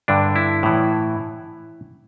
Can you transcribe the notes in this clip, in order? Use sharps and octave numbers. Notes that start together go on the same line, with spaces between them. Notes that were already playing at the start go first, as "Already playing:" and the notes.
G2 D3 D4
E4
A2 E3